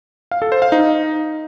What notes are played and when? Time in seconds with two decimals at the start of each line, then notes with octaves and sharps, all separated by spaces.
0.31 F5
0.42 A4
0.52 C5
0.62 F5
0.72 D#4